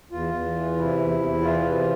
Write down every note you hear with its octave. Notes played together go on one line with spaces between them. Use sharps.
E2 F4
E2
E3
C3 E4
E2
E2
E3 F4
C3